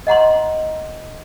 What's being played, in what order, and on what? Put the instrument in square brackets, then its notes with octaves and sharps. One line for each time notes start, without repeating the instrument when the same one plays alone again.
[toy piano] D#5 F#5 A#5 C6